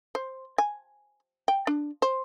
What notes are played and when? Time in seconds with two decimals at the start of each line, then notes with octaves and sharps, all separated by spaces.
0.15 C5
0.58 G#5
1.48 G5
1.67 D4
2.02 C5